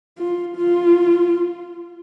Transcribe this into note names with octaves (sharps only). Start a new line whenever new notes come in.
F4
F4